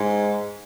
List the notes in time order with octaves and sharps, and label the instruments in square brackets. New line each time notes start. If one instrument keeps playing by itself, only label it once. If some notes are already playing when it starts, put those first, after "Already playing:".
Already playing: [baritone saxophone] G#2